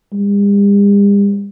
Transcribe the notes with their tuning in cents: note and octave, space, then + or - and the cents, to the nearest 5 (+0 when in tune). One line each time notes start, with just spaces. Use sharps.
G3 +45